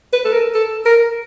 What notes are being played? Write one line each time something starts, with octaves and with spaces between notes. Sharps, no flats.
B4
A4
A#4
A4
A#4